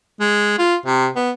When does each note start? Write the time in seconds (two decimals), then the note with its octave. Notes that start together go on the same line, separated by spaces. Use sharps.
0.20 G#3
0.58 F4
0.86 C3
1.16 B3